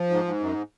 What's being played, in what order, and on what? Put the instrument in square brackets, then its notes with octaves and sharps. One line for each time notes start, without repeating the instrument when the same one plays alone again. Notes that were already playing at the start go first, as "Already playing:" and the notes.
Already playing: [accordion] F3
G#2
G#2
F#2